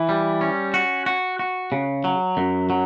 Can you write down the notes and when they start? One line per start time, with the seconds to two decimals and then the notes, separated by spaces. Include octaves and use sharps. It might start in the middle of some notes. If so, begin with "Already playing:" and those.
Already playing: E3
0.09 G3
0.41 C#4
0.74 F#4
1.06 F#4
1.39 F#4
1.72 C#3
2.04 F#3
2.37 F#2
2.70 F#3